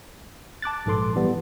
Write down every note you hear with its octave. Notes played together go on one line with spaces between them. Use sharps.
A5 D6 F#6 A6
A#1 G#2 A4 C6 D6
E3 G3 B3